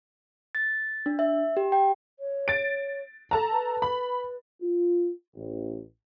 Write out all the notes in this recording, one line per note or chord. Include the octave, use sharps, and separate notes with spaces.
A6
D4
E5
G4
G5
C#5
A6 D7
A4 A5 A#5
B4
B5
F4
A1